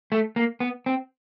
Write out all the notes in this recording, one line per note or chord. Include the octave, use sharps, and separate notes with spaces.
A3
A#3
B3
C4